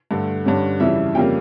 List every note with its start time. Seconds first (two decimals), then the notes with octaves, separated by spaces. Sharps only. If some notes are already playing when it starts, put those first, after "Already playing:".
0.11 G2 D3 A3
0.45 G2 D3 G3 C#4
0.80 F2 C#3 E3 G3 E5
1.15 F2 C#3 G3 A#3 G5